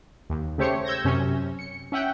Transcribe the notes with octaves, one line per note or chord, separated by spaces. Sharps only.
D#2
C#3 A3 G4 C5 C#5 C#7
E6 G6 G#6 A#6
F#2 C3 C#4
C#7
C#4 E5 F#5 G5